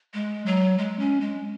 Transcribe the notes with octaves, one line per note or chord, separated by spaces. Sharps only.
G#3
F#3
G#3
C#4
G#3